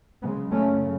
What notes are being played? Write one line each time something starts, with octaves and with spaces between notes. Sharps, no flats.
F#2 C#3 G#3 B3
A3 C#4